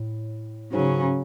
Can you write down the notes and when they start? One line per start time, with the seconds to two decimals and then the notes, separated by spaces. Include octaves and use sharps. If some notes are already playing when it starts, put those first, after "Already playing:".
Already playing: A2
0.73 G#2 C#3 F#3 C#4